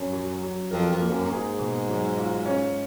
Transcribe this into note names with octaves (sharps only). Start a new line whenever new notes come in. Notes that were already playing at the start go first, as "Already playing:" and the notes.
Already playing: F#2 C#4
F#3
F#3
F2 A#4
F2
A#3
F#2
F#2
G#2 G#4
B2
F#3
F4
C#4